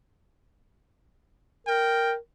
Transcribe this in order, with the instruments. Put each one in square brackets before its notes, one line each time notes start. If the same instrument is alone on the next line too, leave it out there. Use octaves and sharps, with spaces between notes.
[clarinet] A#4 [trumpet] G5